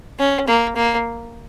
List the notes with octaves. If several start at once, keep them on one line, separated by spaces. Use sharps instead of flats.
C#4
A#3
A#3